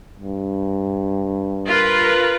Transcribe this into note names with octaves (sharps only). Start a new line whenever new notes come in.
G2
F4 A#4 B4